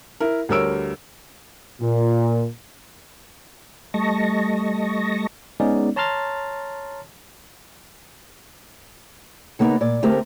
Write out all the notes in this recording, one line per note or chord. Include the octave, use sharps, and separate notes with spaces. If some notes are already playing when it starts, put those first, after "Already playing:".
E4 A#4
D2 G3 A#4 C#5 E6 D7
A#2
G3 A3 D#5 A5 C#6 A#6
G#3 B3 C#4 D#4 G#4 D5
C#5 A5 A#5 C6 F6 A6
C#3 A#3 B3 D#4
A#2 D5
D2 A3 C4 G4 A#4